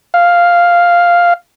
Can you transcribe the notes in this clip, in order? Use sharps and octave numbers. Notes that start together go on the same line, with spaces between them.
F5